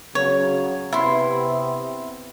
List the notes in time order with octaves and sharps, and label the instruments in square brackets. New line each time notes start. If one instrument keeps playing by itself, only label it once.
[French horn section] C#3 F#3 [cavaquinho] C#5
[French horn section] C3 B3 [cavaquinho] E4 C6